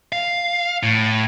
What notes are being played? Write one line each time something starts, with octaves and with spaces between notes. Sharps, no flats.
F5
A2